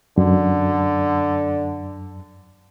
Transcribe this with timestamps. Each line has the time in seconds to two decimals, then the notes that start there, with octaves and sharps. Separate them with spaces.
0.18 F#2 D3